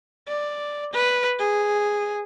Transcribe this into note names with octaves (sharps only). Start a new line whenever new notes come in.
D5
B4
G#4